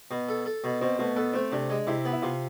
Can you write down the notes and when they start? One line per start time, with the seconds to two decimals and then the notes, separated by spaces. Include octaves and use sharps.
0.11 B2
0.29 A4
0.46 A4
0.64 B2
0.81 B2 C4
0.99 B2 A3
1.16 B3 A4
1.34 A3 C4
1.52 C3 D4
1.70 G#3
1.87 C3 E4
2.05 B3
2.13 E4
2.22 C3 F4